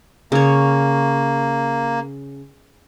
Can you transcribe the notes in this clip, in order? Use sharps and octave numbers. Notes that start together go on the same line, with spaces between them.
C#3 A#3 C#5